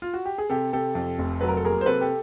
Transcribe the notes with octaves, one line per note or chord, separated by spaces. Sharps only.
F4
F#4
G4
G#4
C3 G4 A4
C3 G4 A4
F2
F1
F#3 B4
A#4
A4
A#3 G#4 A#4
C5
C3 A4 B4
G4 A4